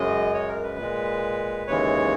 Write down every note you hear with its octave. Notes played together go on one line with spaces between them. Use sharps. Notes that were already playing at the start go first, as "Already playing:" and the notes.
Already playing: F#2 C#3 G#3 D#5
C#5
A#4
B4
A#2 G#3
D#2 C#3 E3 G#3 C#5